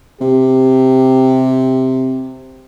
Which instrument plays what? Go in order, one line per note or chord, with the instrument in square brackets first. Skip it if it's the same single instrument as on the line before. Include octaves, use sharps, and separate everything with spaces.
[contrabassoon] C3 [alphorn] G4